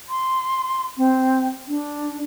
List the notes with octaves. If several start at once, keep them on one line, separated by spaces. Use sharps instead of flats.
C6
C4
D4